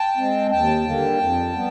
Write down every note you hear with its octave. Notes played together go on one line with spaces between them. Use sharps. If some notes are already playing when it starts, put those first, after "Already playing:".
Already playing: G5 A5
G#3 C4
D#2 G5 A5
D3 G3 A#3
F2
G3 B3